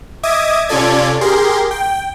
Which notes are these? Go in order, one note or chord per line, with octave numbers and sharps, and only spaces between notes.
D#5 E5 D6 D#6 G#6
C3 C#4 F4 A4 D5 G#6
G4 G#4 A#4 C6
G5